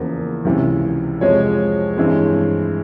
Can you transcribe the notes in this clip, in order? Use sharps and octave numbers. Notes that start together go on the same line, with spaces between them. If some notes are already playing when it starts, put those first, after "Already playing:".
Already playing: E2 C#3 F3 A#3
C#2 C3 E3
F2 C3 F3 G#3 C#5
G2 E3 G#3 C4